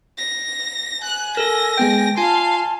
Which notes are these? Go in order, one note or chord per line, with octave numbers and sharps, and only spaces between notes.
A#6
G#5 F#6
A4 A#4 A#6
G#3 B3 G5 G6
F4 F5 G#5 A5 C6